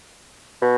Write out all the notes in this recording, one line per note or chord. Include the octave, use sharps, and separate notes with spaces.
B2